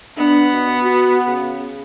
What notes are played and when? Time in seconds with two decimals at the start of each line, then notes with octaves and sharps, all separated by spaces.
0.17 B3 D4
0.52 B2
0.82 F#4
1.27 C#3